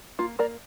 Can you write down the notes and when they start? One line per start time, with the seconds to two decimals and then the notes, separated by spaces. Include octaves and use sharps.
0.19 A#3 F4
0.39 A#3 A#4 D5